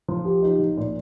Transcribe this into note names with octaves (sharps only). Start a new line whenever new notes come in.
F3
G4
D#4
F3
A#2